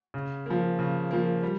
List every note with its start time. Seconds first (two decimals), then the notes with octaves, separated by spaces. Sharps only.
0.14 C#3
0.46 F3 A#3
0.79 C#3
1.11 F3 A#3
1.43 G3